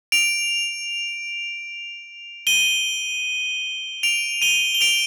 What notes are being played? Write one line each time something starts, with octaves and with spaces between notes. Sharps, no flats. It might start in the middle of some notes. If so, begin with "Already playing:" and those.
D7 F7
D#7 G7
D7 F7
D#7 G7
G7
D7 F7